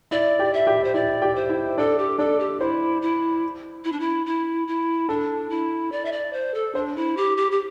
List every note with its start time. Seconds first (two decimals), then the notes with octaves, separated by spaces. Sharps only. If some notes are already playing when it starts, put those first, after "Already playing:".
0.11 E4 D5 E5
0.39 G4 G5
0.54 E5
0.67 G4 G5
0.84 C5
0.94 E4 D5 E5
1.22 G4 G5
1.35 C5
1.50 E4 E5
1.78 D4 A4 D5
1.98 G4
2.18 D4 A4 D5
2.39 G4
2.60 E4 C5
3.02 E4
3.84 E4
3.92 D4
4.00 E4
4.26 E4
4.67 E4
5.09 D4 A4
5.50 E4
5.92 D5
6.05 E5
6.12 D5
6.33 C5
6.54 A4
6.75 D4 C5
6.96 E4
7.17 G4
7.37 G4
7.52 G4